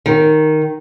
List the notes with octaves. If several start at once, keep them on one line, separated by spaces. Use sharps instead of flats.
D#3